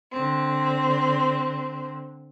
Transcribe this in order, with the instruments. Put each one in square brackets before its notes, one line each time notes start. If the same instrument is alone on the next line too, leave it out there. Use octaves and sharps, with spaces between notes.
[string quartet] D3 C4